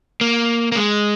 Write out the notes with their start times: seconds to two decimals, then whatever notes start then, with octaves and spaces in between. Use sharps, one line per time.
0.21 A#3
0.72 A#3
0.76 G#3